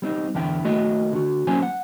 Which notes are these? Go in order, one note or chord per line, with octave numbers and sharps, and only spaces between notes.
G3 C4 D#4
E2 D3 E4 G5
D#2 A3 F#4 D#5
D3 F#4
F#3 A#3 C#4 C5 G#5
F#5